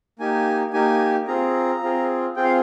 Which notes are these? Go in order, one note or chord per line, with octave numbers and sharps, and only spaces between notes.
A#3 D#4 G4 G#5
A#3 D#4 G4 G#5
C4 F4 G#4 A#5
C4 F4 G#4
C4 F4 G#4 G5
F5